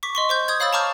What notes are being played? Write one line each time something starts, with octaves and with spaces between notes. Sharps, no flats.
C#6 D6 B6
D#5 C6 C#6
C5 C#6 G6
D#6 G6 G#6
C#5 F5 B5 D#6 E6 A6
A5 A#5 C#6 D6 F6 G6